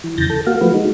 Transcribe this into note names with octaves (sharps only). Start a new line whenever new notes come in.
E3
E2 C#3 E3 G6 A6 A#6
A4
A#3 F#4 F5
F3 A3 F#4 B4
G#3 D#4 F#4